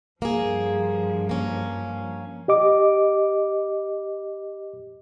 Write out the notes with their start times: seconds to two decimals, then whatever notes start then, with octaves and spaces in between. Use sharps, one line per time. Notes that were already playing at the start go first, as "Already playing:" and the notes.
0.22 G2 F3 A#3 G#4
1.29 A#3 C#4
2.48 G4 D#5 D6